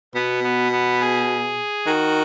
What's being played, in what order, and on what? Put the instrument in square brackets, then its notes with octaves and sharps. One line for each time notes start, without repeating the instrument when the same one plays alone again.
[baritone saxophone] B2 [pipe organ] B3
[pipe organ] B3
B3
G#4
[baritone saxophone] D#3 [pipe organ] F#4